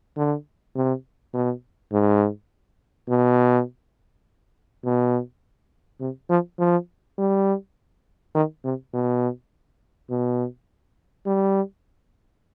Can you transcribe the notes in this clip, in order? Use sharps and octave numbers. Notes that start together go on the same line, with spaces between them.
D3
C3
B2
G#2
B2
B2
C3
F3
F3
G3
D#3
C3
B2
B2
G3